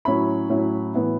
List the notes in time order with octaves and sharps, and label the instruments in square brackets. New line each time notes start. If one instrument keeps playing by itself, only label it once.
[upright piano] A2 F#3 C#4 E4 B5
A2 F#3 C#4 E4
A2 E3 B3 E4